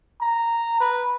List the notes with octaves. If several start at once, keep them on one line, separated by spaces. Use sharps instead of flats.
A#5
B4